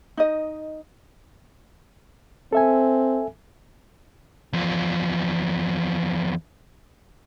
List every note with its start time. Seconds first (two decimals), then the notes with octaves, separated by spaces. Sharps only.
0.17 D#4 D#5
2.53 C4 A4 E5 G#5
4.53 E2 F3